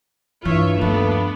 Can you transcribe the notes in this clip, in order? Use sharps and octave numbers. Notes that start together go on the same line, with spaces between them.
G2 E3 F4 C#5 E5
D#2 F3 A3 B3 D4